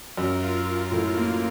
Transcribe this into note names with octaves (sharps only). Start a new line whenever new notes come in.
F#2 A#4
F4
F4
A2 A#4
A#3